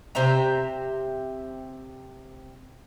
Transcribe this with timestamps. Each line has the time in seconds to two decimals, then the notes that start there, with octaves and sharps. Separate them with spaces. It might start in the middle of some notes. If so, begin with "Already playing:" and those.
0.15 C3 C5 E5 A#5